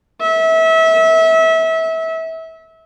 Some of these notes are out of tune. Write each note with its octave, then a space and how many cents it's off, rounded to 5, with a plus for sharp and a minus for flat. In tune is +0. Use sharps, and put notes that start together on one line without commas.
E5 -25